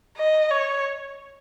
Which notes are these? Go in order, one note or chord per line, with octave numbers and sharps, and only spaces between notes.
D#5
C#5